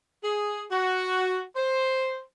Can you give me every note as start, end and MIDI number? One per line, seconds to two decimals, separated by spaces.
0.24 0.64 68
0.72 1.43 66
1.56 2.22 72